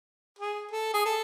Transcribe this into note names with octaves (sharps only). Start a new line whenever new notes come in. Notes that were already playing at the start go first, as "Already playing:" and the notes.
G#4
A4
G#4
A4